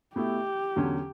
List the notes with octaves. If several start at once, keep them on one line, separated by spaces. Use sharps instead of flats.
B2 A3 E4 G4
E2 D3 F#3 C#4